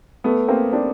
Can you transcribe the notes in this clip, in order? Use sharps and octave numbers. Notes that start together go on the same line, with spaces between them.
A3 B3
A#3 C4
C4 D4